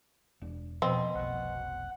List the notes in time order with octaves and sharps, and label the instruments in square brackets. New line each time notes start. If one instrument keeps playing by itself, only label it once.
[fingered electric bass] E1 D4
[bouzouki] B2 [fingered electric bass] F3 [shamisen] C4
[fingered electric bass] F1 B1 [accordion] F#5